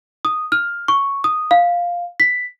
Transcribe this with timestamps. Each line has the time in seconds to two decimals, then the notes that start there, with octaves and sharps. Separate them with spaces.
0.25 D#6
0.52 F6
0.88 C#6
1.24 D#6
1.51 F5
2.20 B6